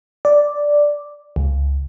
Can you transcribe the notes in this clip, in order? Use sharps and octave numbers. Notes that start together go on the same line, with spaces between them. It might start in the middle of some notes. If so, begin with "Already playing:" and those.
D5
C#2